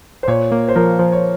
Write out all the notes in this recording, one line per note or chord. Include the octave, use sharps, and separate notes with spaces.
C5
A#2 C#5
A#3
C5
F3 A#4
F3 C5
C#5